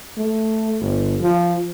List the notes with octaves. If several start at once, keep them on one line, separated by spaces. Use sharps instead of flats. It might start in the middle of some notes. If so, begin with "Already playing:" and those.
A3
G1
F3